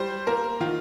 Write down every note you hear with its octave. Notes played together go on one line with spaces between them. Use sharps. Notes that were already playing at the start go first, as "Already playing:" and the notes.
Already playing: G3 C5
A#3 A#4
D#3 F4